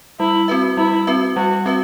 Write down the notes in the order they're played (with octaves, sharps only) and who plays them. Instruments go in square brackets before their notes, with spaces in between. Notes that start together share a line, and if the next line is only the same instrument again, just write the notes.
[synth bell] G3 [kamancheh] E4
[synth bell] C4 F#4 B4 E5
[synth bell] G3 [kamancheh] E4
[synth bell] C4 F#4 B4 E5
[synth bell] G3 [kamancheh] F#4
[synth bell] C4 F#4 B4 E5